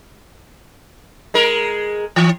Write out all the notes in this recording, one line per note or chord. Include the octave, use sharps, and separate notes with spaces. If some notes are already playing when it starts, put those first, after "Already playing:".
G#3 A#4
E3